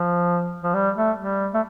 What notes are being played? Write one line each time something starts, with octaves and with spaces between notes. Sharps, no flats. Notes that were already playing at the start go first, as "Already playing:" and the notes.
Already playing: F3
F3
G3
A3
G3
A3